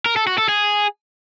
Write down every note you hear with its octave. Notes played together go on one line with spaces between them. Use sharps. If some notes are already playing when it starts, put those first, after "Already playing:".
A#4
A4
F#4
A4
G#4